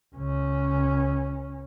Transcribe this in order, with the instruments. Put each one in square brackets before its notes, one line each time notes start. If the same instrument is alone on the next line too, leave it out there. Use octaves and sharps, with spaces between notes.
[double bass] C#2 C#4